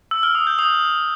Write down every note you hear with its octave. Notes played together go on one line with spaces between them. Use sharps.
E6
F6
D#6
G6
D#6